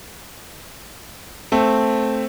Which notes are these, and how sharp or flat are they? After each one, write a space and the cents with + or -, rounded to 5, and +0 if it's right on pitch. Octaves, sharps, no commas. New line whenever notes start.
A3 +0 C4 +0